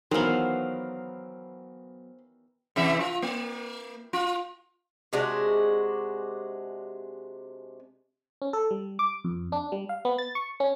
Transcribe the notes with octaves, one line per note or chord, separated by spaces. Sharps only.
D#3 E3 F#3 B3 C5 F5
C3 E3 E5
F4
A#3
F4
C3 G#3 D4 F#4
C#4
A4
G3
D6
F2
D4
G3
F5
B3
A6
C#6
C#4